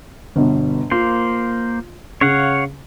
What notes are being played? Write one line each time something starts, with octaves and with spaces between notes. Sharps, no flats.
G1 B2
A#3 F4 C5
C#3 C#5 F5 F#5